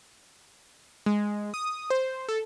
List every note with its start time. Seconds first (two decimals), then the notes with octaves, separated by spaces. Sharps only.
1.06 G#3
1.54 D#6
1.90 C5
2.29 A4